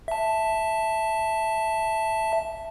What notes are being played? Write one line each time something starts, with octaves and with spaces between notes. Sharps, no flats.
E5 A5